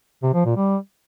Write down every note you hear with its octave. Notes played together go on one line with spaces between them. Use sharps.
C3
F3
A#2
G3